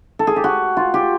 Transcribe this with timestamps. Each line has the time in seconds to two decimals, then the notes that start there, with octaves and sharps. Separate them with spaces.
0.19 A4
0.27 G#4
0.36 G4
0.44 F#4
0.77 F4
0.94 G4